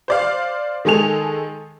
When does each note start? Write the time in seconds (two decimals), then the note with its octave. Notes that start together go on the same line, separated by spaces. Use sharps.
0.08 C5 D5 F5
0.85 D#3 G#3 A4 G#5 F7